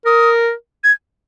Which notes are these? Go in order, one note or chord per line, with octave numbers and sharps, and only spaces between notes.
A#4 D#6
G#6